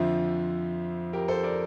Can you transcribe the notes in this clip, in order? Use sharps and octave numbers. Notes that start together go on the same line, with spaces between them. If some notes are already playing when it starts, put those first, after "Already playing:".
Already playing: F2 D3 F3 C5 E5
G4 A#4
A4 C5
A#4 D5